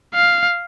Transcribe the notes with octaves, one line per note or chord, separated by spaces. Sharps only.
F5